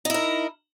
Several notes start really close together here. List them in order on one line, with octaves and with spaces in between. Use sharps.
D#4 E4 A#4